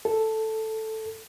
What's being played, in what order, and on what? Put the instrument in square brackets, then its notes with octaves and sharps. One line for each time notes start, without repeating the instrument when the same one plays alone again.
[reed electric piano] A4